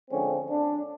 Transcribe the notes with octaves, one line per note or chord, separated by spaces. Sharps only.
D3 F3 G#3 C4 C#4
D4